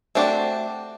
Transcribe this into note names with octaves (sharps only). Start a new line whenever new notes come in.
A3 C4 D4 F#4 G4